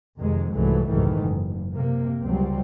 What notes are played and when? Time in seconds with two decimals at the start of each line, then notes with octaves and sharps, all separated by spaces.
0.17 F2 C3 D#3 G#3
0.53 C2 G#2 E3 F#3 G#3 A3
0.89 C2 F2 G#2 D#3 E3 A3
1.19 F#1 F#2
1.74 C3 A#3
2.22 C#2 F#3 G3 C4